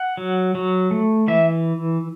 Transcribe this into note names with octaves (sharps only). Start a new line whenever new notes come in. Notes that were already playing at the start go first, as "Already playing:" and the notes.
Already playing: F#5
F#3
F#3
A3
E3 E5